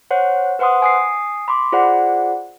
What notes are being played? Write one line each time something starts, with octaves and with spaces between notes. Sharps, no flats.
C5 C#5 F#5
B4 C5 F#5 C6 D#6
G#5 D#6 C7
B5 C6 D6
F4 G#4 C5 D5 F#5